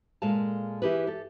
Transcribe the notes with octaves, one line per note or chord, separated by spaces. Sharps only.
A#2 G#3 A4 F5 A5
E3 E4 G4 G#4 B4
G4 A4